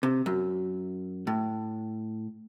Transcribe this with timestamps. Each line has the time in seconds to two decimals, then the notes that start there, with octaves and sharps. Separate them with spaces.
0.03 C3
0.26 F#2
1.27 A2